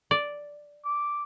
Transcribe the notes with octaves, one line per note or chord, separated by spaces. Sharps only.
D5
D6